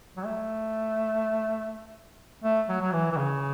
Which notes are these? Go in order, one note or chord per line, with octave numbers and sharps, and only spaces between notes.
F#3
A3
A3
F#3
F#3
E3
E3
C#3